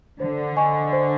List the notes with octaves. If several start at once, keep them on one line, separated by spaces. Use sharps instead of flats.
D3 C5
D#5 G#5 C#6
C5